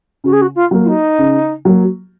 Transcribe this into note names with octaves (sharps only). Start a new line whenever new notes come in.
C#3 F#4
G#4
F#4
F4
F#3 A#3
F4
D#4
C#3
F#3 A#3